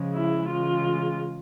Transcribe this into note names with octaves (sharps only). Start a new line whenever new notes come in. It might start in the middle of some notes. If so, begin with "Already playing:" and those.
Already playing: C#3 F3 G#3
E4
C#3 E3 G#3 F4